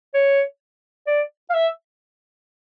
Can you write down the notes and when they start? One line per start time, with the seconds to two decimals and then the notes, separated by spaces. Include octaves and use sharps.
0.14 C#5
1.07 D5
1.50 F5
1.54 E5